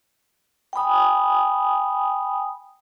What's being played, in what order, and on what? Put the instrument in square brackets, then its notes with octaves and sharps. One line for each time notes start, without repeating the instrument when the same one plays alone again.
[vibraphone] G5 G#5 B5 D#6